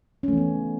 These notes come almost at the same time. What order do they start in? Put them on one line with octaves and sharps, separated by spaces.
C#4 A3 E3 B3